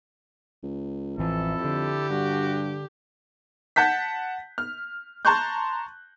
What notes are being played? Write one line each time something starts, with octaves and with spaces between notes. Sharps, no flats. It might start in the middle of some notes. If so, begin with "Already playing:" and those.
C#2
A1 F2 E3 E4 A4
D3 G4
G2 F#4
F#5 A5 G6 B6
F6
A5 A#5 C6 C#6 F#6 G6